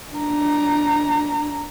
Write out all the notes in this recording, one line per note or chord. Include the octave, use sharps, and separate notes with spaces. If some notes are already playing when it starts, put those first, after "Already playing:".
D4 A#5